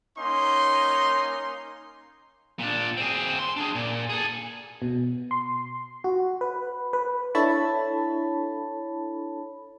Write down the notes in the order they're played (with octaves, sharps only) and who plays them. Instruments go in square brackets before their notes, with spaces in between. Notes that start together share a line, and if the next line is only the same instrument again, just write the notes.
[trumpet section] A#3 C#4 D#4 C6
[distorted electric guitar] A#2 D4
C4 G#4
C6
D4 G#4
A#2
G#4 A4
[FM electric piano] B2
C6
F#4
B4
B4
D4 E4 A4 C#5 A5 B5